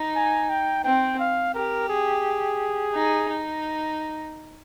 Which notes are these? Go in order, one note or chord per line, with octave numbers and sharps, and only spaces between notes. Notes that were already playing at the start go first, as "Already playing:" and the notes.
Already playing: D#4
G#5
G5
C4 G5
F5
G4 A#4
G#4
D#4
D#4